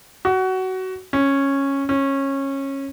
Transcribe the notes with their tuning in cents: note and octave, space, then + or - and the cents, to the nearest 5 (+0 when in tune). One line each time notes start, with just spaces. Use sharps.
F#4 +20
C#4 -10
C#4 -20